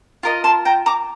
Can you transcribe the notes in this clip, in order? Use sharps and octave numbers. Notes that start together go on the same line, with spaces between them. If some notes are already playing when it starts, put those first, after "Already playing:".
F4 A#4 D#5
A5 C6
G5 A#5
A#5 D6